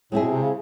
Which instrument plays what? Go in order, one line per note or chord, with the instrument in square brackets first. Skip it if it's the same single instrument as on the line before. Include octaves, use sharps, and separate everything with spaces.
[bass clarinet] A2 [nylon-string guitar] G#3 C4 E4 G#4
[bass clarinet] B2
C3
C#3